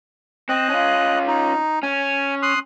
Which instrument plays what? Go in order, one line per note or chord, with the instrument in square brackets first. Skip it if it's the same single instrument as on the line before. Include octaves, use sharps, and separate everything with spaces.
[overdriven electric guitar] C4 [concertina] D#5 F#6
[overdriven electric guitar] C#4 F4
[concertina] D#4
[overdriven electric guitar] C#4 [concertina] G#5
[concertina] C6 D#6 F#6